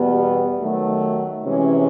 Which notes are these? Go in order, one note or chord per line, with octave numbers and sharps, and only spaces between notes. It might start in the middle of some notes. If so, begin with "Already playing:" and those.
Already playing: E2 B2 G3 B3
D#3 F#3 A3
C3 E3 G#3 C#4